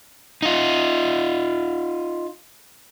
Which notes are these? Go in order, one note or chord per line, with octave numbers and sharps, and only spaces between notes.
D#4 F4